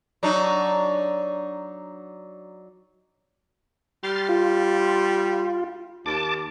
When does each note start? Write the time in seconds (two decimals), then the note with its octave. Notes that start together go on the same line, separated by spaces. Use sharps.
0.23 F#3 D4 D#4
4.03 G3 C6 F6 A6
4.29 F4
6.06 D#2 A5 D6